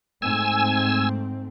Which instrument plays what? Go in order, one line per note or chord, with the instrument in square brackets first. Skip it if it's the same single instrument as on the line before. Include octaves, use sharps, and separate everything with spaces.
[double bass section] G#2 A3 C4 [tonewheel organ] G#5 E6